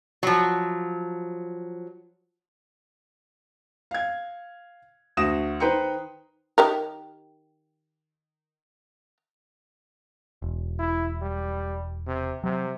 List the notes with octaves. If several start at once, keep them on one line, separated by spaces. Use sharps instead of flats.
F3 F#3
F5 G#6
D2 F#4 D#6 A#6 E7
D#3 B4 C5 G5 A#5 C#7
D#3 G4 A#4
E1
E4
G3
C3
C3 F#3